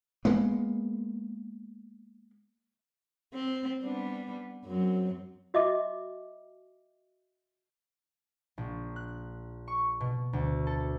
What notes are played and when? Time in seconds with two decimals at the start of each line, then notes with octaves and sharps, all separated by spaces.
0.25 G#3 A#3 B3
3.34 C4
3.82 G3 B3 D4
4.65 F#2 F#3 C4
5.54 F#4 D#5 E5 D6
8.58 A#1
8.96 F#6
9.68 C#6
10.01 B2
10.33 D2
10.67 A4